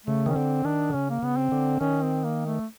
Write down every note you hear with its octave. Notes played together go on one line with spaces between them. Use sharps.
C#3 A3
D#3 C#4
D3 C4
D#3 D4
D3
C#3 C#4
A#3
C#3 B3
C4
D3
D#3 C#4
C4
A#3
A3